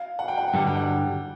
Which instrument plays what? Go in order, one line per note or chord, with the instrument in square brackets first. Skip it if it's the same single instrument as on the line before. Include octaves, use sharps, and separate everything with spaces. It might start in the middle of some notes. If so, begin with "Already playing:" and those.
Already playing: [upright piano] F5
F#5
G5
F#5
G5
[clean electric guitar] G2 D3 G3 [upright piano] F#5
[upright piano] G5
F#5